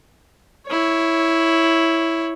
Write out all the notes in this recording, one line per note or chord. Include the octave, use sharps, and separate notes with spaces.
E4 C#5